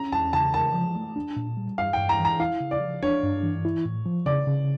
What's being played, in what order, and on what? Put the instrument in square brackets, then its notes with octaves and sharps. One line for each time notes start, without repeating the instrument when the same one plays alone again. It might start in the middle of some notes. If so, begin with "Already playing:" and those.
Already playing: [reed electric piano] C#4 [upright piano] A#5
[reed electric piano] E2 [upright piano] A5
[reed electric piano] C#3 [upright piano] A5
[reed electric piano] A#4 [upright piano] A5
[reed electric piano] F3
A3
D4
A#2
G3
[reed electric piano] G2 [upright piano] F5
[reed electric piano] G2 [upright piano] G5
[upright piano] A#5
[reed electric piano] E3
[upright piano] A#5
[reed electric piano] E4 [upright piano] F5
[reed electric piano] C#3
[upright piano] D5
[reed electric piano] F3
[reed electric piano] D4 [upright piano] C#5
[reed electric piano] G2
E3
E4
A2
F3
[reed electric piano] C#3 [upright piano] D5
[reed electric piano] C#3